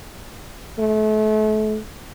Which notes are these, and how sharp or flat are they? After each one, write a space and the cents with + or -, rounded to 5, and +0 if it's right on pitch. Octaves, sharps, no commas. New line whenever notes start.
A3 -35